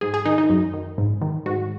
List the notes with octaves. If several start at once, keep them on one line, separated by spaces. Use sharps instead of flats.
G#2 G#4
G#4
D#3 D#4
D#4
F#2
D#3
G#2
D#3
G#2 F#4